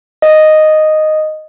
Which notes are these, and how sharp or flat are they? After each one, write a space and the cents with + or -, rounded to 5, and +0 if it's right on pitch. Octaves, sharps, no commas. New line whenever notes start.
D#5 -5